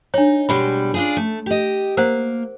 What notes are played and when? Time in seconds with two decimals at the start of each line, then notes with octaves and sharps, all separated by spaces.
0.14 D4 D#4 C#5
0.49 B2 G3 G#3 B5
0.94 D4 F4 G#4
1.17 A3
1.46 G4 D#5
1.97 A#3 A#4 C5 F#5